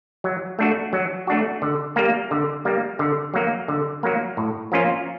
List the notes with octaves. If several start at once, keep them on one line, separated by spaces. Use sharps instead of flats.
F#3
A3 D4 F#4
F#3
A3 D4 F#4
D3
G3 A#3
D3
G3 A#3
D3
F#3 A#3
D3
F#3 A#3
A2
F3 A#3 C#4 F4